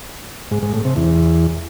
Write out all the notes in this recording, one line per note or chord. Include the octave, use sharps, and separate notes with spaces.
G#2
G#2
A2
C3
E2